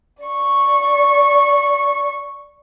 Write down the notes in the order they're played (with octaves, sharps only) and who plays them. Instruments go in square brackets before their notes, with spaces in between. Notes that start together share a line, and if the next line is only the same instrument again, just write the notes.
[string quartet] D5 C#6